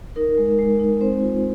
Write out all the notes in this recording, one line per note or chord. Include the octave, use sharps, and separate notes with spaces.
D#4 A#4
G#3
G#3
D#4
C4 C5
F4